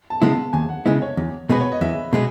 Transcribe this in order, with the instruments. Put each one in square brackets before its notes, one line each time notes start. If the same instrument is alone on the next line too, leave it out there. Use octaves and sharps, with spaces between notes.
[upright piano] A5
[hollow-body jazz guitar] C#3 G#3 B3 E4
[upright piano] A5
[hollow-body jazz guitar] D#2 [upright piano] G#5
[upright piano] F#5
[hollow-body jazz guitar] C#3 G#3 B3 E4 [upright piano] D#5
[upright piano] C#5
[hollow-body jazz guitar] E2
[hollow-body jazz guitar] B2 G#3 B3 F#4 [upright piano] B4
[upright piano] C#5
D#5
[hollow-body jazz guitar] E2 [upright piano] E5
[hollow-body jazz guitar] B2 G#3 B3